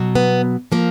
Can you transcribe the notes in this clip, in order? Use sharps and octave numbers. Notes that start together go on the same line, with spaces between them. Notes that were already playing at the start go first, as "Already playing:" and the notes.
Already playing: B2 F#3
B3
F3 A#3